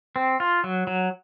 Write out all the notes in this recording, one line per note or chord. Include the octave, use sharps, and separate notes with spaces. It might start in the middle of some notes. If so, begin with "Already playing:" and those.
C4
F4
F#3
F#3